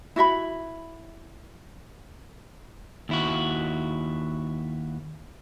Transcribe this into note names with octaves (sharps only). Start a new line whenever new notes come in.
E4 F#4 E5 B5
D#2 E4 F#4